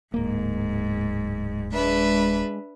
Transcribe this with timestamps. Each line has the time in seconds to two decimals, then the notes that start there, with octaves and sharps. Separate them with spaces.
0.14 D1 G#2 A#3
1.73 G#3 D4 B4 E5